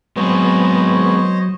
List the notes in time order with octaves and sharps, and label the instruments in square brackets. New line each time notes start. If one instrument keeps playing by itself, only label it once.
[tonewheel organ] F#3 [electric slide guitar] G#3 C4 G#4 [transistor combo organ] B3 [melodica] C5 C#5 D#5